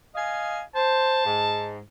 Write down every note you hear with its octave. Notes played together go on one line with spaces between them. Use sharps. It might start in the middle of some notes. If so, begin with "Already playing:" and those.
D#5 F5 G#5
C5 A5
G#2